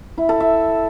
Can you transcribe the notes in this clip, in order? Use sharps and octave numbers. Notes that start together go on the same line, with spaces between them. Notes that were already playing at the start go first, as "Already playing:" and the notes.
E4
A4
E5